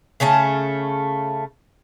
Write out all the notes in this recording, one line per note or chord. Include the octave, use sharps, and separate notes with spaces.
C#3 A3 C#4 A5